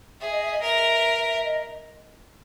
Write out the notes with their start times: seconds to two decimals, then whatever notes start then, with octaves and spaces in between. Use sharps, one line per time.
0.21 G#4 E5
0.31 D#5
0.42 E5
0.52 D#5
0.62 A#4 E5
1.44 D#5